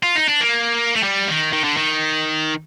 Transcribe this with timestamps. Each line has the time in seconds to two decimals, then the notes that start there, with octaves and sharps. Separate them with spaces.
0.03 F4
0.16 D#4
0.29 D4
0.41 A#3
0.96 A3
1.03 G3
1.28 D#3
1.53 D#3
1.64 D3
1.77 D#3